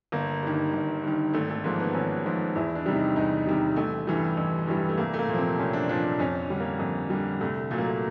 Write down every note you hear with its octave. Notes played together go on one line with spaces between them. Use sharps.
G1 A#3
G2 D#3
G1
G2 D#3
G#1 A3
A3
G#2 F3 A#3
B3
G#1 C#4
G#2 F3
E2 E4
D4
C3 D#3 G3
D#4
E2 D#4
C3 D#3 G3
A1 A3
G2 E3 G3
A1
G2 E3 G3
A3
C2 A#3
A3
A#3
A#2
F3 C4
C2 C#4
D4
A#2 F3 D4
D4
F2 C#4
D3 G3
A#3
F2
D3 G3
C2 A3
A#2 F#3 A3
A#3
A3